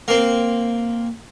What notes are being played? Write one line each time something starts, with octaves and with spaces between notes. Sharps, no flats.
A#3 C4